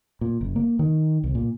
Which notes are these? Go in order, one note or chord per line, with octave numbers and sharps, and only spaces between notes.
A#2
F#1
A#3
D#3
C2
A#2